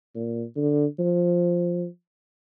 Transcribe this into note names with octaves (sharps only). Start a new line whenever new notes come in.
A#2
D3
F3